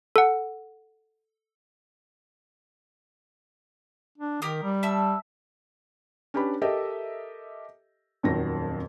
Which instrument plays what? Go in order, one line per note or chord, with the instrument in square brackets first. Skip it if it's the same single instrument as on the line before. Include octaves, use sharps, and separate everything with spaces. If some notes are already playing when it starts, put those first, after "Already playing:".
[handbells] A4 F#5
[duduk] D4
[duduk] D#3 [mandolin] G4 A#4 D#6
[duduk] G3
[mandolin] E5 A5 E6
[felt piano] C#4 D4 G4 B4 B5
G4 A4 A#4 D#5 E5
D#1 F2 D#3 F#3 C4 A#6